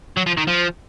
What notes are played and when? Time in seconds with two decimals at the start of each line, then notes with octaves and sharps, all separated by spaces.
0.17 F#3
0.27 F3
0.38 D#3
0.48 F3